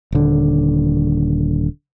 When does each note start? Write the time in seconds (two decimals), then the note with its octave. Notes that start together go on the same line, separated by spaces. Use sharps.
0.12 D#1 D3